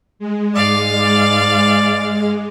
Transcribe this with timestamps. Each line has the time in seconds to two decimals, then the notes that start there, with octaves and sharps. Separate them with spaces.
0.19 G#3
0.54 G#2 D5 F5 A6
0.93 D5